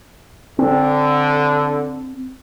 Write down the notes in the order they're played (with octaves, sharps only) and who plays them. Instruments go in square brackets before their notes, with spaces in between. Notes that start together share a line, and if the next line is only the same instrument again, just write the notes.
[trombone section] D3 [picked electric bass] C4